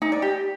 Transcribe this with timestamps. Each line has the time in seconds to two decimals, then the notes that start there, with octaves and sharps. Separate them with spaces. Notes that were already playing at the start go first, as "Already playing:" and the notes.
0.02 D#4
0.12 D5
0.22 G4